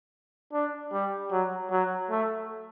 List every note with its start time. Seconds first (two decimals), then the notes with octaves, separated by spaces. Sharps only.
0.53 D4
0.93 G3
1.32 F#3
1.71 F#3
2.10 A3